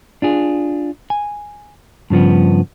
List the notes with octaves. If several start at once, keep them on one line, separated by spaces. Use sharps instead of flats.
D4 F4 G#4
G#5
G2 C#3 F3 B3